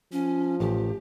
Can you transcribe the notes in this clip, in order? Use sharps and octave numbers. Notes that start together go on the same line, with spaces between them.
F3 C#4
A1 G4